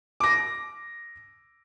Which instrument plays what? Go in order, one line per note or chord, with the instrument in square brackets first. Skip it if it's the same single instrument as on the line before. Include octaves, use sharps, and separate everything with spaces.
[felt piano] D6 A#6